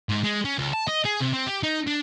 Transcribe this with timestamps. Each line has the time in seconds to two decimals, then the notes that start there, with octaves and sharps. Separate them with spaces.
0.09 G#2
0.24 G#3
0.45 C#4
0.58 C#2
0.73 A5
0.88 D#5
1.05 G#4
1.20 C3
1.33 C4
1.47 G4
1.63 D#4
1.87 D4